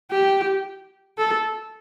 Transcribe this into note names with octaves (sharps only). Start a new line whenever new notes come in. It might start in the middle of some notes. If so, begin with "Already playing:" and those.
G4
A4